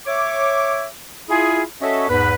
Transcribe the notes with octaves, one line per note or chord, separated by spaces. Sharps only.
C#5 E5 D6
E4 F4 G#4
C#4 F#4 A4 C#5 D#5 E5
E2 G#2 B4